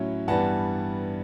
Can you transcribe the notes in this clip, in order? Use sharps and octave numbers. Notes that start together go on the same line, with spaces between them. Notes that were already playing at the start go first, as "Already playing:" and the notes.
Already playing: A2 F#3 C#4 E4
G2 E3 G3 B3 F#5 A5